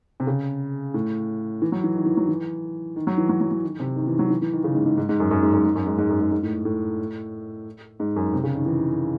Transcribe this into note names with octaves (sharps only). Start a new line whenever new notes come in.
C3
C#3
A2
E3
F#3
E3
D#3
E3
F#3
E3
D#3
F#3
E3
F#3
F#3
F#3
D#3
C3
D#3
E3
F#3
E3
E3
D#3
C#3
G#2
G#2
G#2
G#2
F#2
F#2
G#2
F#2
G#2
F#2
G#2
G#2
F#2
G#2
G#2
A2
A2
G#2
F#2
C3
C#3
D#3
E3